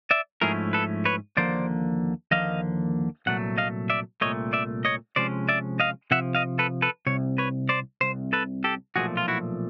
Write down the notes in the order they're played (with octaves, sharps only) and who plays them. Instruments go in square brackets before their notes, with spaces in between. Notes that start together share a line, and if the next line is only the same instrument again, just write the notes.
[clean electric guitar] D5 E5
G#2 F3 A3 C#4 E4 G#4 A#4
A4 B4
B4 C#5
D#2 D3 F3 A#3 C5 D5
D#2 D3 F3 A#3 D#5 F5
C2 A#2 F#3 A3 F#5
D#5 F5
D5 E5
C2 A#2 F#3 A3 C#5 D#5
D5 E5
C#5 D#5
C3 F3 G#3 C#4 C5 D5
D5 E5
D#5 F5
C3 F3 E5 F#5
D#5 F5
A4 B4
A4 B4
C2 C3 C#5
B4 C#5
C5 D5
C2 C3 C5
A4 B4
G4 A4
B1 A#2 F3 A3 F#4 G#4
F4
E4 F#4